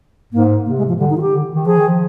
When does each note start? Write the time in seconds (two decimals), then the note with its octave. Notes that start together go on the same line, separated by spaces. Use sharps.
0.33 G#2 A#3
0.66 C3 A#3
0.78 G#3
0.88 F3
0.99 D3 G3
1.10 D#4
1.16 D#3 F4
1.21 G4
1.33 D3
1.55 D#3
1.66 F3 G#4
1.77 D#3
1.88 F3